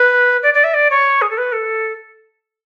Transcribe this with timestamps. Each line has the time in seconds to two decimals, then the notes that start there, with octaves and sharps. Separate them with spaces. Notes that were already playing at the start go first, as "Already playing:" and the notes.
Already playing: B4
0.43 D5
0.54 D5
0.64 E5
0.74 D5
0.90 C#5
1.22 G#4
1.30 A4
1.38 B4
1.52 A4